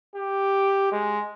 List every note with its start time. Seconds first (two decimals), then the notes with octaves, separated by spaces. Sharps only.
0.16 G4
0.92 G#3